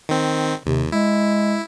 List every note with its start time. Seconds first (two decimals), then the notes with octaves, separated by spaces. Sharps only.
0.09 D#3 C4
0.66 D#2 C3
0.92 G#3 E4